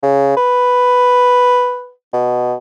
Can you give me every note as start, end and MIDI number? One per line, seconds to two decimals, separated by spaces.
0.03 0.35 49
0.37 1.92 71
2.13 2.54 47